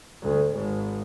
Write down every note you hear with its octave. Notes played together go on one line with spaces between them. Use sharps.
D2
G#1